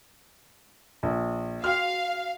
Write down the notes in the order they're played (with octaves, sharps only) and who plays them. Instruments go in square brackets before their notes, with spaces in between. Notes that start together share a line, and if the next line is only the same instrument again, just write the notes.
[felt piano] A#1
[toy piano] F#4 G#4 G5 [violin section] F5 [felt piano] F6